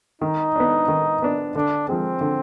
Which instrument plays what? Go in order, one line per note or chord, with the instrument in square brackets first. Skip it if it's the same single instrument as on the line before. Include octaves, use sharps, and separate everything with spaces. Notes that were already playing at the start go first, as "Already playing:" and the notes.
[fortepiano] D#3 [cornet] D#4
[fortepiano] B3 D4
D#3
B3 D4
[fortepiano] D3 [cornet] D4
[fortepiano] F3 G#3 [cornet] C4
[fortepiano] D3